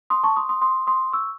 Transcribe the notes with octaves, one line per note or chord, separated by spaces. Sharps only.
C6 D#6
A5 C#6
C6 D#6
C6 D#6
C6 D#6
C6 D#6
C#6 E6